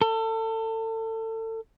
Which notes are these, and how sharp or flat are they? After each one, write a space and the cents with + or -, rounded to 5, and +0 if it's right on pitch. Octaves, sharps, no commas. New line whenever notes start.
A4 +30